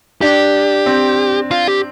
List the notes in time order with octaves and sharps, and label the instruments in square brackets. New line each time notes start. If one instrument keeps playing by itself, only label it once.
[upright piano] D4 [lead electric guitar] G4
[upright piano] C4
[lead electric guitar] F4
G4